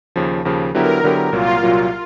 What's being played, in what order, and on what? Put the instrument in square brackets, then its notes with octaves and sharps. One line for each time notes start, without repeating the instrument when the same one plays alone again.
[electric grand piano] D#2 C#3 F3
D#2 C#3 F3
[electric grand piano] D3 F#3 B3 E4 G4 [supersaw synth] A#4
[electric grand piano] D3 F#3 B3 E4 G4
[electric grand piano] C2 A#2 F#3 A#3 [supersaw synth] F4
[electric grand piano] C2 A#2 F#3 A#3